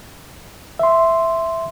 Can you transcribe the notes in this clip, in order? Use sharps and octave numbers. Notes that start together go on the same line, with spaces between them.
E5 C6